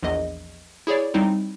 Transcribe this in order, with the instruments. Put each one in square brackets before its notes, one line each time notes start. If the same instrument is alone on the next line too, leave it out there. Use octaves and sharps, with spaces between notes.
[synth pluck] A#1 E2 D#5
E4 G#4 C#5 D5
G3 C4 D#4 E4